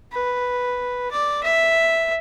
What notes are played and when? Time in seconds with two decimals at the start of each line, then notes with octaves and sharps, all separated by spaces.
0.12 B4
1.11 D5
1.44 E5